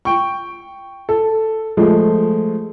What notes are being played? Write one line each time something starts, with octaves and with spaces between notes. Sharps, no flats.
G5 C#6
A4
F3 G#3 A3